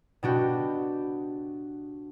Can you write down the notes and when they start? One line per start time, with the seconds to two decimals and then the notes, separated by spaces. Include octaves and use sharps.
0.23 B2 D4 F#4 G4